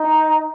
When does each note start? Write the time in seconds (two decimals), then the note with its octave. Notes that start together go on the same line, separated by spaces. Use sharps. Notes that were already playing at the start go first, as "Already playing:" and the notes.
Already playing: D#4